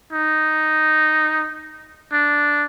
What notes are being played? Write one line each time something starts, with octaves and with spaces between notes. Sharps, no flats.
D#4
D4